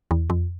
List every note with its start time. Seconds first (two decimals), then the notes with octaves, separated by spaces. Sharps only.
0.11 E2
0.30 F2